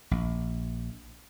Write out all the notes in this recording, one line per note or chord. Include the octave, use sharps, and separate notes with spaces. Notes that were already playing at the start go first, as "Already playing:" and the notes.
A#1